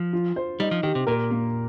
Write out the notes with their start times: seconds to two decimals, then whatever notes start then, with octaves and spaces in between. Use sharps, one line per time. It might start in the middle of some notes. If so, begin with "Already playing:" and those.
Already playing: F3
0.13 F4
0.36 C5
0.60 G3 D#4
0.71 F3
0.83 D#3 G4
0.95 C3
1.07 A#2 A#4
1.30 A#3